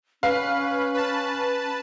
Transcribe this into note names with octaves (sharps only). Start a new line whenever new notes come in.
C#4 B4 F5
B4 A5